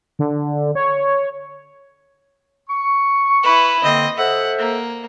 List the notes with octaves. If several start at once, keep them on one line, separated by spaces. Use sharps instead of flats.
D3
C#5
C#6
E4 B4
D3 A#3 C4 D#5
A4 C5 E5 F#5
A#3